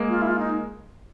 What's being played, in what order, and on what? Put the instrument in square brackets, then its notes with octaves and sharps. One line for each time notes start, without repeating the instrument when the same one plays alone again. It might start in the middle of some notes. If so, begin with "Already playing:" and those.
Already playing: [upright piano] G#3 A#3
[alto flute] F4
E4
F4
D#4